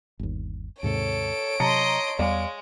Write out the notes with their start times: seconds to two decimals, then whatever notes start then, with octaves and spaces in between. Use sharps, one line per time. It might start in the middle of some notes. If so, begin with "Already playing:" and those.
0.19 G1 D#2
0.83 D#2 G#2 C3 A4 C#5 D7
1.60 C3 F#3 D#5 A5 A#5 C6 C#7
2.19 E2 G3 G#3 D5 F5